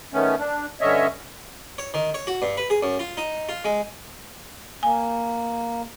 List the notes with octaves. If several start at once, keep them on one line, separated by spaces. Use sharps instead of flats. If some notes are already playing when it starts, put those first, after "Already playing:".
D#3 A3 B3 C#4
D4
G2 D3 C#4 C#5 D#5 E5
C#5
D#3
C#5
F#4
G2
B4
G#4
F#2
F4
D#4
F4
G#3
A#3 G#5